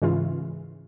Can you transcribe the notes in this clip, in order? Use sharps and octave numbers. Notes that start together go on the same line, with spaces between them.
G#2 C#3 E3 F4